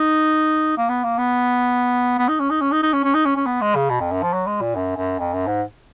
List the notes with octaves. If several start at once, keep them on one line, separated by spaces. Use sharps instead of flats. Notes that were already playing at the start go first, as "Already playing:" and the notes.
Already playing: D#4
A#3
B3
A#3
B3
B3
D#4
C#4
D#4
C#4
D#4
D#4
C#4
C#4
D#4
C#4
C#4
B3
G#3
C#3
B2
F2
F#2
F3
F#3
G#3
A#2
F#2
F#2
F2
F#2
G#2